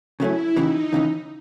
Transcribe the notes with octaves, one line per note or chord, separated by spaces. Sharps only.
C#3 F#3 A3 C#4 E4
D#2 C#3 E3 D#4
D#2 C#3 E3